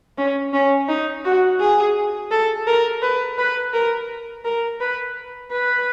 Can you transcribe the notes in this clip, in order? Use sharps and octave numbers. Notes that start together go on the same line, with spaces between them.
C#4
C#4
D#4
F#4
G#4
A4
A#4
B4
B4
A#4
A#4
B4
B4